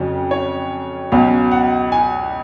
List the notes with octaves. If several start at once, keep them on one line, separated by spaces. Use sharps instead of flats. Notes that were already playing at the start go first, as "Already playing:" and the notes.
Already playing: F2 C#3 F#3 C#4
C#5
C#2 B2 F#3 C#4 F5
F#5
G#5